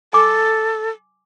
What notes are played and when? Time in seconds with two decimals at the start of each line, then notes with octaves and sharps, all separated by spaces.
0.13 A4 G#5 D6